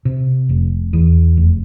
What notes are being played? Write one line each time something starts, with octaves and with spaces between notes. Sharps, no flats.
C3
F1
E2
F1